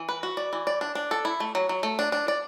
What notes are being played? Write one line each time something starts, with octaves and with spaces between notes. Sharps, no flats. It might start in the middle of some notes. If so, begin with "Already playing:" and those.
Already playing: E3
B4
F#4
D5
E3
D5
D4
D4
A4
E4
A3
F#3
F#3
A3
D4
D4
D5